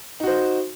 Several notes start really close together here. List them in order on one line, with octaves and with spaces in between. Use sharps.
D#4 F#4 C5